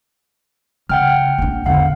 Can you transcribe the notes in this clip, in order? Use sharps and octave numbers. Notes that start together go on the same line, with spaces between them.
C#3 F#5 G5 F6
A#1 D4
E2 D3 F5 F#5